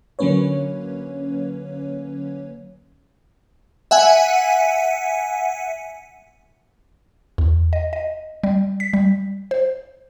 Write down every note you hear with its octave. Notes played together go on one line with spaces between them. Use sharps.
D3 F#3 A#3 C#4 B4 C#5
E5 F#5 G#5
E2
D#5
D#5
G3
B6
G3
C5